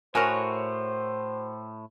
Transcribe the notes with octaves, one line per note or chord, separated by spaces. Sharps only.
A2 F#4 A#4 C5 C#5 G#5